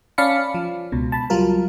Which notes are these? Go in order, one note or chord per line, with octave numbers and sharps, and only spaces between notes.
C#4 D5 F5 A5 B5 C#7
F3
C#2 B2
A5 B5
F#3 G3 F4 A#4